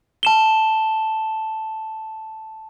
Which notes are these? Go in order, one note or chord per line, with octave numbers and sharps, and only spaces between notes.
A5 E7 G7